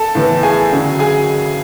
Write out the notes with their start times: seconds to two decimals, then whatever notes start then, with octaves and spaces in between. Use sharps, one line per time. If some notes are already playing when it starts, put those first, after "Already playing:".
Already playing: A4 A5
0.15 A2 E3 B3
0.43 G#4 G#5
0.72 D2 C#3 F#3
0.99 G#4 G#5